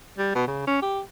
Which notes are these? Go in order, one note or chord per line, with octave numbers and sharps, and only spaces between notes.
G3
B2
C#3
C#4
G4